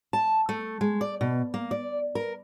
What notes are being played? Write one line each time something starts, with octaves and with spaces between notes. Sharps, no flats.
A5
A3
G#3
D5
B2
A#3
D5
A#4